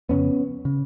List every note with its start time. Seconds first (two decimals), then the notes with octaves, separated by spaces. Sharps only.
0.09 F2 C#3 B3 C#4
0.65 C#3